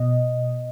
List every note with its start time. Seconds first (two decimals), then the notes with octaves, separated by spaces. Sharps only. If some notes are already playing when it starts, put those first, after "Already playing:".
Already playing: B2 D#5